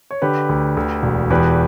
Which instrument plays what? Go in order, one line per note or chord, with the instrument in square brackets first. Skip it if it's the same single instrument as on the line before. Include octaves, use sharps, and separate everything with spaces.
[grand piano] C#5
D3 G4 B4
D2
D2
E1
E2 G4 B4